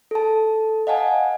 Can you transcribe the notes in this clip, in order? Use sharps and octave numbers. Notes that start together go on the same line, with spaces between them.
A4 A5
D#5 F5 F#5 G#5 A5